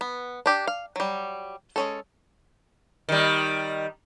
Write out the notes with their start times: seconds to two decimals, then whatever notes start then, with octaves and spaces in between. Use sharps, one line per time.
0.01 B3
0.46 D4 G4 D5
0.67 F5
0.96 F#3 G3
1.76 G#3 C#4 A4
3.09 D#3 G3